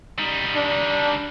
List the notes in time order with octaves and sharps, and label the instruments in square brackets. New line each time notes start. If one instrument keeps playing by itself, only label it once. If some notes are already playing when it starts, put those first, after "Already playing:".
[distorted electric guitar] G3 D#4
[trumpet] D4